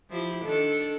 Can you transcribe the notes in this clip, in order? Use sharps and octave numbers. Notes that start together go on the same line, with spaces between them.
F3 E4 G4
D#3 D4 A4